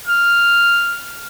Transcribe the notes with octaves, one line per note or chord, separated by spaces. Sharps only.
F6